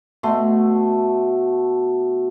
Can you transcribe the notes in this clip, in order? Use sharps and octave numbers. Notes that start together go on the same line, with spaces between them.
B2 A3 C6